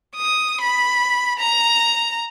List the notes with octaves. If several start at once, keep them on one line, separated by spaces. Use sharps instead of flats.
D#6
B5
A#5